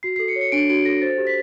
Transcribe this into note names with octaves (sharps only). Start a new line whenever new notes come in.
F#4 C7
A4 C7
C#7
C#5
C#7
D4 D7
F#4 D7
A4 A#6
C5 A6
G4
B6